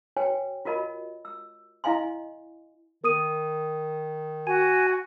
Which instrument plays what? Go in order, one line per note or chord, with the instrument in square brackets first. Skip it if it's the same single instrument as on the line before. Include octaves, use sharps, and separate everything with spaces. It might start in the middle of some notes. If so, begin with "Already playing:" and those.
[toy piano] F#4 B4 C#5 G5 G#5
F4 F#4 A#4 D#5 B5
E6
E4 D#5 F5 G#5 C6
[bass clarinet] D#3 [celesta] A#4 D#6 D#7
[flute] F#4 [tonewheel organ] G#5